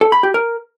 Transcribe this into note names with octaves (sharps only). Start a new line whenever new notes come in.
A4
B5
G4
A#4